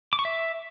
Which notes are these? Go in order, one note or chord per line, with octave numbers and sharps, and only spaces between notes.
D6
C#6
E5